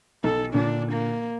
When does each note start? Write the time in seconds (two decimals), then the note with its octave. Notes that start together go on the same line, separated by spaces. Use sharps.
0.24 B1 A4
0.54 A#2 D3 D4
0.92 A#3